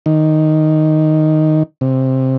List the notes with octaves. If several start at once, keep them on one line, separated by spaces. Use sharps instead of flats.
D#3
C3